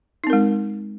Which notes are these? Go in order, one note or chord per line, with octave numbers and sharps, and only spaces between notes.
G#3 C4 D#4 A#4